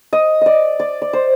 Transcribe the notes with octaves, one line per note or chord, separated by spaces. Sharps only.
D#5
D5 D#5
D5
D5
C5